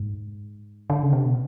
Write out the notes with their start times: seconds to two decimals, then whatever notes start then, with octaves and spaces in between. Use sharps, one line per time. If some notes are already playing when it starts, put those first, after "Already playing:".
Already playing: G#2
0.90 D3
1.02 C#3
1.13 C3
1.26 B2